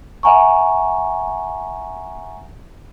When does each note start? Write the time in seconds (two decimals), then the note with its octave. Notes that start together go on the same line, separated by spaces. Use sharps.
0.23 E5 F#5 G#5 A#5 C#6